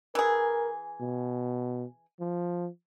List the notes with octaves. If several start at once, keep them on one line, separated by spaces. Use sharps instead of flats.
E3 G#4 A#4
B2
F3